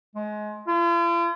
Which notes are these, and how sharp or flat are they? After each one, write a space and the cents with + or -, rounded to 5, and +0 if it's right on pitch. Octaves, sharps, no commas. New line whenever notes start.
G#3 +25
F4 -45